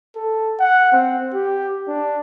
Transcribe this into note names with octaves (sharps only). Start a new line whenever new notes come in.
A4
F#5
C4
G4
D4